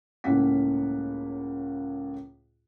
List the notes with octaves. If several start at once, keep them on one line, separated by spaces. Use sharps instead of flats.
C#2 A2 A#3 C#4 F#5 B6